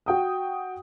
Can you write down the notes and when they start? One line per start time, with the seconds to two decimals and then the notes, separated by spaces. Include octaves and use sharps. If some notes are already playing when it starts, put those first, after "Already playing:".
0.06 F#4 G5 D#6